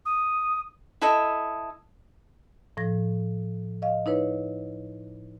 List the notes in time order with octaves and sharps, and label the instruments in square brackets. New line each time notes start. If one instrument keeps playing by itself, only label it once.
[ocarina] D#6
[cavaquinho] E4 A4 D#5
[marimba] A2 F3 A#6
D#5 F5
D#4 E4 B4 C#5